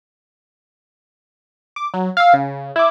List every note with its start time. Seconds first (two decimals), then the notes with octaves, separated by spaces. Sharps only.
1.76 D6
1.94 F#3
2.17 F5 E6
2.33 C#3
2.76 E4 D6